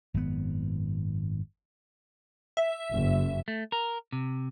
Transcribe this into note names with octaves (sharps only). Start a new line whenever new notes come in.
G#1 F#2 D#3 B3
E5
F#1
A3
A#4
C3